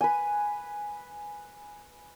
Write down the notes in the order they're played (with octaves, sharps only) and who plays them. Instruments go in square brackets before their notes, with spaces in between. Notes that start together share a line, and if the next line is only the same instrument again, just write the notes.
[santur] B4 G#5